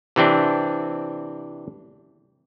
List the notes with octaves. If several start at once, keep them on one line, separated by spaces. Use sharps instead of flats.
C3 E3 C4 D4